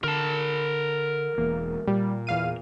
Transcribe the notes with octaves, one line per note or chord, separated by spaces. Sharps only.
D3 A#4 A5
E1 E3 A#3
A#2 G3
E2 F5 D#7